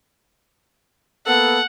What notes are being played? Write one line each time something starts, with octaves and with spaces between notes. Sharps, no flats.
A#3 B3 A4 F#5